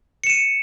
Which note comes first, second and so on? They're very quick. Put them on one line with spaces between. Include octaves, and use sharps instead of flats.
C#7 E7 D#7